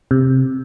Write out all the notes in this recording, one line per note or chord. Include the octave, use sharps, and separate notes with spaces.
C3